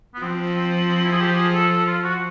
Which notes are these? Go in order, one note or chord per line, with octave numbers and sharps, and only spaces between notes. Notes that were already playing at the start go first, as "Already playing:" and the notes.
B3
F3 C4
C4
C4
E4
G#4
G4
G#4
A4
A4
F4
F#4